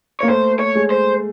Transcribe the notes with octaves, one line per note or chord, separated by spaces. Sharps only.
A#3 C#5
A3 C5
C#5
G#3
C5